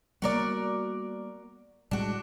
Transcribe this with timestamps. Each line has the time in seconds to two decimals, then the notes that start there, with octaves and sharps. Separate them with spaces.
0.22 G3 A#3 B3 F#4 A#4 D5
1.91 A2 G3 G#3 D4 F#4